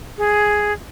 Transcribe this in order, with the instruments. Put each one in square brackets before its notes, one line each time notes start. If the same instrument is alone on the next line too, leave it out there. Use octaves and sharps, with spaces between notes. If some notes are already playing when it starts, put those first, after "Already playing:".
[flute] G#4